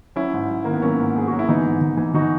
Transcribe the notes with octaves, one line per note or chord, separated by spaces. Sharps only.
F#3 C#4 E4
G#2
F#3
D#3 A#3
B3
F#3 A#3 C#4
G#2
G#2 G#4
F#3 F#4
E4
E3 B3 D#4
G#2
E3
E3
E3 D#4 F#4